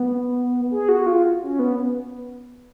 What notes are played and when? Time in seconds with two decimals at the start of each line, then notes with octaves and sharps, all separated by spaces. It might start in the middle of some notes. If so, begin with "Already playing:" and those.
Already playing: B3
0.71 G#4
0.89 F#4
1.06 F4
1.42 C#4
1.59 B3